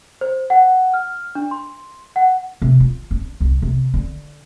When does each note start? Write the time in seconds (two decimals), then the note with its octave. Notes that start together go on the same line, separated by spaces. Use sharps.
0.21 C5
0.50 F#5
0.94 F6
1.35 D4
1.51 C6
2.16 F#5
2.62 C3
2.80 F4
3.11 D4
3.40 C2
3.62 C3
3.94 D3